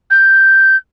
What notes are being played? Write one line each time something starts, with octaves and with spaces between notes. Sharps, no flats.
G6